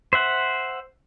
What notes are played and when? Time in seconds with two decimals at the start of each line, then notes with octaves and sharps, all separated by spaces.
0.13 C5 E5 F#5